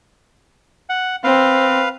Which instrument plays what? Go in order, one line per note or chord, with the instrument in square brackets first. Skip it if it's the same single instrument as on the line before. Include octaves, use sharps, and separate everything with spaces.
[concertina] F#5
[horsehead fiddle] C4 [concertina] B4 F5